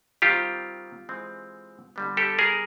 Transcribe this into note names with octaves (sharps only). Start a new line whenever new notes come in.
D#3 G3 C4 F4 G4
E3 G#3 C4
D3 G3 B3
G4 A4
G#4 A#4